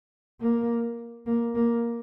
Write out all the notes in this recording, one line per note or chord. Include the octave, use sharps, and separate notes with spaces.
A#3
A#3
A#3